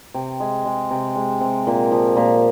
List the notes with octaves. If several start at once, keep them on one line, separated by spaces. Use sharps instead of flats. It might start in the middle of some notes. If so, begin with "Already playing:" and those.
C3
G#3
G#3
C3
G#3
C3
A#2
F3
A#2